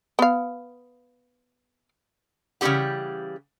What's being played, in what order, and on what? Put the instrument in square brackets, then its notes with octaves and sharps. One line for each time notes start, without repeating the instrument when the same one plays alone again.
[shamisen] B3 F5
[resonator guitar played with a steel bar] C#3 E3 G3 C4 G4 F#5